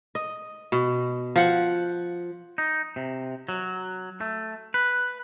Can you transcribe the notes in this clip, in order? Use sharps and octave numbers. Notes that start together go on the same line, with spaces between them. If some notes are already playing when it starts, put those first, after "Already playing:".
D#5
B2
F3 F#5
D#4
C3
F#3
A3
B4